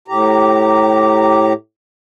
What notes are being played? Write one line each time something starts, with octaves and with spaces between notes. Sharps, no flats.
A2 G4 A#5